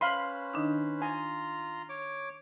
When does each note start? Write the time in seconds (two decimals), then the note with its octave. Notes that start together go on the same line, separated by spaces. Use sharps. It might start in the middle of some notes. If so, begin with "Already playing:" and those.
0.01 C#4 B4 C5 F5 B5 C6
0.54 D#3 D4 D#4
1.02 F4 G#5 A#5 C6
1.89 C#5 D6